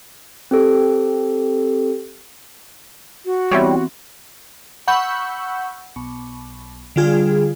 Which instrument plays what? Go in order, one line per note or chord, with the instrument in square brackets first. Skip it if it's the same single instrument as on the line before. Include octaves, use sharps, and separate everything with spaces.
[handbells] C4 G4 A4
[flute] F#4
[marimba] E3 B3 C4 [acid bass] G3 [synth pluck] E4 G4 C#5
[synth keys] F#5 B5 C#6 E6 G6
B1
D3 G3 F4 G#4